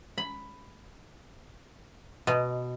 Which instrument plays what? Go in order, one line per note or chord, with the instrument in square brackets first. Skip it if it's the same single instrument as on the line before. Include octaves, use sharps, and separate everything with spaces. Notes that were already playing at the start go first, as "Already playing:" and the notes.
[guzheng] B5
B2